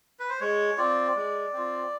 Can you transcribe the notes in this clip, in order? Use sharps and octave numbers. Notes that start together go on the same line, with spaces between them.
B4
C5
G#3 C#5
C4 F4 D5
G#3
C4 F4